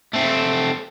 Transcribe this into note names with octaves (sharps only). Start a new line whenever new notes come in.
A3 C4